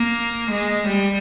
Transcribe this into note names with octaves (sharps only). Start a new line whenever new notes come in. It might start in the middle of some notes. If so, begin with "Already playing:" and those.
Already playing: A#3
G#3
G3